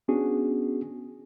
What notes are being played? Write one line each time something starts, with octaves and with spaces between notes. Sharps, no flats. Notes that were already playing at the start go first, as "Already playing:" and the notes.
B3 C#4 D4 F#4 G#4